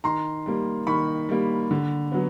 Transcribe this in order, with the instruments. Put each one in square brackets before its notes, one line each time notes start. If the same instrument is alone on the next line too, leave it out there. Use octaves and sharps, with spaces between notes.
[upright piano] D#3 A#5 C6
G3 A#3
D#3 B5 C#6
G3 A#3
D3
F#3 B3